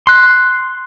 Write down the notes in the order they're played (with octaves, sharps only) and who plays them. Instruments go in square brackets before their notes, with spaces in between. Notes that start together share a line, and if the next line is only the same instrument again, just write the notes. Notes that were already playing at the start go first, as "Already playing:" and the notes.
[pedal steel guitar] C6 F#6